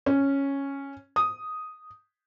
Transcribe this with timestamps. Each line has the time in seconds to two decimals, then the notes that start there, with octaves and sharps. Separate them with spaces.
0.06 C#4
1.16 D#6